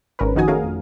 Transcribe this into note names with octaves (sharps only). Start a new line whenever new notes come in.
G#1 C#4 A#4 B4
F2 D#3 D#4 F#4 G#5 D#6
A3 C#4 F#4 G#4 A#4 F5
F2